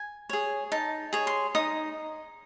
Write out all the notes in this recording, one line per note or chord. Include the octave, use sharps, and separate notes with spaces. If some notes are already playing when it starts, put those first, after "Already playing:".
Already playing: G#5
G#4 C#5
D#4 A5
G#4 C#5
C6
D#4 D#6